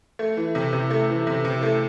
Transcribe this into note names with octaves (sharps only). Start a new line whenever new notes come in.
A3
E3
C3
C3
A3
E3
C3
C3
A3